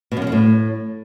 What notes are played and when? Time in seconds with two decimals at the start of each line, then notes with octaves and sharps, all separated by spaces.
0.12 B2
0.17 F#2
0.22 D#3
0.27 F3
0.32 A2